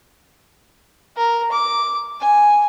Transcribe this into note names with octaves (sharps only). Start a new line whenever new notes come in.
A#4
D6
G#5